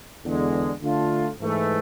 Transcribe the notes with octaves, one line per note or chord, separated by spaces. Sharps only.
E2 D3 G#3
D3 A3 D4 F4
G#2 E3 A3